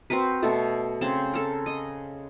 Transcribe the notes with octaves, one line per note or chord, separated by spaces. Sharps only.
C4 F#4 A#4 B4
B2 A3 A4
C#3 C4 A5
A4 A#4
D#5